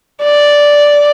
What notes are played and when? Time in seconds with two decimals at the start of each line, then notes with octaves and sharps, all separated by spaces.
0.22 D5